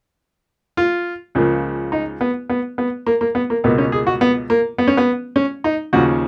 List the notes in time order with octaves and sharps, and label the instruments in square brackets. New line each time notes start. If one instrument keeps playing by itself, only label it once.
[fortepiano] F4
C#2 C#3 F3 A#3
D#4
B3
B3
B3
A#3
A#3
B3
A#3
C#2 B2 A#3 B3
C#4
G#4
F#4
B3
A#3
B3
C#4
B3
C#4
D#4
D#2 C#3 F3 F#4